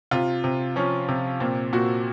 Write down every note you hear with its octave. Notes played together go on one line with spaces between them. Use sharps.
C3 F4
C3
F3 C#4
C3
A#2 C4
A#2 F#4